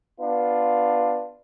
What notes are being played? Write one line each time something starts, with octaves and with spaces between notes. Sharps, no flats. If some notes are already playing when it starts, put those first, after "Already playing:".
B3 D4 F4